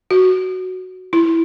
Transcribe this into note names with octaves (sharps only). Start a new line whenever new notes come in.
F#4
E4